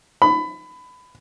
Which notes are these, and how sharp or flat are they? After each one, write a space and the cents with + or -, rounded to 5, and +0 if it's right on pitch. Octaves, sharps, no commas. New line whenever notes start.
B5 +20